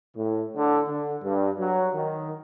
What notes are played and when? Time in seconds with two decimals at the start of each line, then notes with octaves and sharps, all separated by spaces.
0.16 A2
0.56 D3
0.87 D3
1.23 G2
1.58 F#3
1.94 D#3